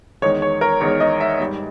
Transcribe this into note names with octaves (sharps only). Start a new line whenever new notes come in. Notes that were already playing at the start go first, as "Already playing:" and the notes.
E2 D#3 G#3 C#5
C#5
A#4
E2 D#3 G#3 C#5
D#5
E5
G#2 G3